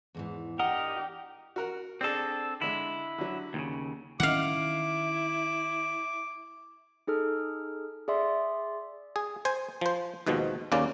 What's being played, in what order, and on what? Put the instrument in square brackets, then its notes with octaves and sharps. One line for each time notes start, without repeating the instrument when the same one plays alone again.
[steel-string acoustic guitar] E2 G#2 E3
[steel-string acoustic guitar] D4 [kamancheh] G4 [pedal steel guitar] A#4 D#5 [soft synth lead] F#5
[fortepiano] F#4 A#4 F#5
[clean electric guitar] C4 A4 [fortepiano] D4 G#4 D5
[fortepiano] D3 G#3 [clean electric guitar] E4
[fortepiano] D3 F#3
[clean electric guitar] D#2 A#2 C#3
[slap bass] D#3 E3 C#4 [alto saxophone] E4 [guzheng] F5 F#5 [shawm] D6
[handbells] D#4 G#4 A4 F6
G#4 D5 E5 C6
[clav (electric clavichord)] G#4
C5 G#5
F3 C5
D#2 G#2 B2 D#3 F3
D#2 C#3 A#3 C#4 D5